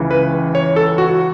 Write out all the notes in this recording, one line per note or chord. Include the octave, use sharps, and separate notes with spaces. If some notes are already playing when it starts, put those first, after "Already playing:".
Already playing: C#2 C#3 E3
B4
C#5
A4
F#4